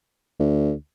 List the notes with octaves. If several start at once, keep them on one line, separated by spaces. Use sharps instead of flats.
D2